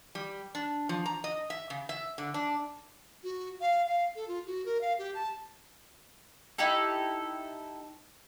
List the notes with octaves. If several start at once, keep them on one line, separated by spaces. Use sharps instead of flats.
G3
D4
F3
A#5
D#5
E5
C#3
E5
D3
D4
F#4
F5
F5
A4
F4
F#4
A#4
F5
G4
A5
D#4 E4 G4 A4